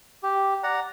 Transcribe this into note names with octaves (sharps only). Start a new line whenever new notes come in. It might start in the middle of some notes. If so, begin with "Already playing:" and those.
G4
D5 F#5 A#5